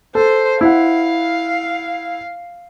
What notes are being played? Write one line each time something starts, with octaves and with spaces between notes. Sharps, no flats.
A4 C5
E4 F5 F#5